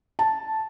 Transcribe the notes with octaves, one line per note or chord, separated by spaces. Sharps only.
A5